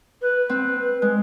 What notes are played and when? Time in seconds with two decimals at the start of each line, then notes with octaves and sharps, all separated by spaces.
0.22 B4
0.49 C4
1.02 G#3